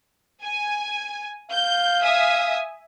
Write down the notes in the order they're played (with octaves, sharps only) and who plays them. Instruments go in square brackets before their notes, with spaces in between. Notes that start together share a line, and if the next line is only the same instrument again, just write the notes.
[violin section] G#5
[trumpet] F5 [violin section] G6
[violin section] E5 G#5 D#6